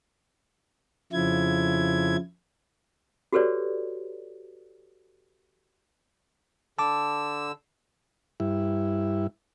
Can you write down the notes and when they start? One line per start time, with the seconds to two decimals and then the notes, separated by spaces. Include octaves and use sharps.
1.13 F2 C#3 F3 E4 G#6
3.33 F#4 G4 A4 B4 C#5 D5
6.79 D3 A5 D6 E6
8.40 G2 E4